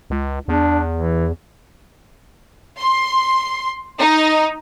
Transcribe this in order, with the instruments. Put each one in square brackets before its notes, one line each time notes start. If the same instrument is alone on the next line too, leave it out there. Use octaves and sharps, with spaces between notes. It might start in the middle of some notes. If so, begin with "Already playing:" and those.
[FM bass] C#2
[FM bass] E2 [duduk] D4
[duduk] E3
[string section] C6
D#4